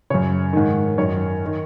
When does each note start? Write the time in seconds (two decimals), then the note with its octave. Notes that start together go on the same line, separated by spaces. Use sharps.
0.10 F#2 C#3 C#5
0.53 G#2 D#3
0.97 F#2 D#3 C#5
1.46 D#3